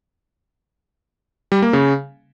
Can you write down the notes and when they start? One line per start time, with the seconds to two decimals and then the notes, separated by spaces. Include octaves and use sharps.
1.52 G3
1.62 A#3
1.73 C#3